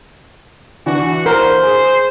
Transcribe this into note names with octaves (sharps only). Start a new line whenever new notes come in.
E3 D4 F#4
A#4 C5
G#4